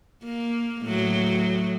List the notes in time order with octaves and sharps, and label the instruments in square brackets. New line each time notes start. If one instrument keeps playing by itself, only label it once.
[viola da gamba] A#3
A2 F#3